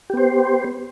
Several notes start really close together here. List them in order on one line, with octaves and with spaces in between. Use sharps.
G4 B3 C5